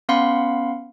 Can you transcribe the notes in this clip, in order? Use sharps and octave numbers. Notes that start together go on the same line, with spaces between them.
B3 C#4 F5 F#5 B5 C6